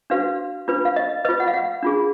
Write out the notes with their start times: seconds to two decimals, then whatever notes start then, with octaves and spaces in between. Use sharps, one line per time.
0.10 D4 F#4 B4 F5
0.68 D4 F4 B4
0.85 F5
0.96 D#5
1.25 B4 D#5
1.29 F4
1.40 F#5
1.47 F5
1.54 F#5
1.83 D4 F4 G#4